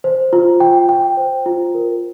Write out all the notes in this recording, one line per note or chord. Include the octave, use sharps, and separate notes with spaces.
C5
F4
G5
G5
C5
F4
A#4